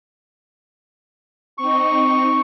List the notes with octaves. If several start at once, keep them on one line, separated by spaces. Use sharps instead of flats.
C4 D#4 C#6